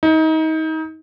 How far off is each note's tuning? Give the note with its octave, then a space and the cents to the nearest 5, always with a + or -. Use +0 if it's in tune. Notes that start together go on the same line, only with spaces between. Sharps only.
D#4 +30